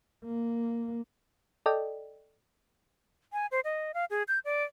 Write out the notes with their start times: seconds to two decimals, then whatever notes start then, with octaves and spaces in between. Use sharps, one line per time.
0.25 A#3
1.66 A4 D5 D#5 G5
3.33 G#5
3.51 C5
3.65 D#5
3.94 F5
4.10 G#4
4.28 G6
4.45 D5